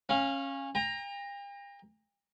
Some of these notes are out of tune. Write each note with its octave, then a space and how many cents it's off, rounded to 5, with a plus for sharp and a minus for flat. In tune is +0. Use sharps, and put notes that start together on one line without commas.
C#4 -20 F5 +0
G5 +45 A#5 +5